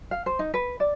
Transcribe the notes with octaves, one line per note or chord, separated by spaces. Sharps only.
F5
C5
D#4
B4
D5